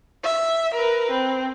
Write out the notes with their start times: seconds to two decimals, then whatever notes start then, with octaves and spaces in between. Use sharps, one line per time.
0.24 E5
0.75 A#4 B4
1.11 C4